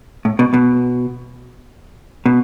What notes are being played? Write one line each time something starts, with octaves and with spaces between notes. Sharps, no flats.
A2
B2
B2
B2